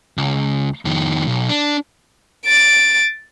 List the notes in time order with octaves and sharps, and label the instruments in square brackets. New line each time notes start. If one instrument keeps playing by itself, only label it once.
[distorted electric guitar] C#2
F2 D#3
B1
D4
[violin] A6 D7